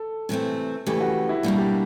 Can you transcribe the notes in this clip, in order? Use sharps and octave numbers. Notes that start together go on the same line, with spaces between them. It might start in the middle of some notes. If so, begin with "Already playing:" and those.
Already playing: A4
C3 E3 A3 C4
F2 C#3 E3 A3 G4
F#4
E4
B2 G3 A#3 D4
G4